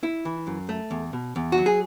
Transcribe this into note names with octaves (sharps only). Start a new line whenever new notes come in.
E4
E3
F#2
A3
E2
B2
E2
F#4
F#3
G#4